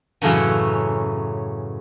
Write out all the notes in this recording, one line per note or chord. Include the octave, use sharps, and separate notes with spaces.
F#2 A2 C#3 E3 F#3 C#4